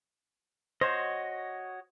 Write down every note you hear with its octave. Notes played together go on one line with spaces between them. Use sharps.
F#4 C5 C#5 D#5